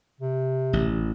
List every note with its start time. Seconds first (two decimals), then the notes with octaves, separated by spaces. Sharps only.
0.21 C3
0.73 A1